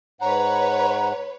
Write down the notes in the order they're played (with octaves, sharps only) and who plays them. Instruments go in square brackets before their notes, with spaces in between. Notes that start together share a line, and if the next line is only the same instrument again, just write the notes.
[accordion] G#2 F#5 [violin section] B4 C#5 [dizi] A#5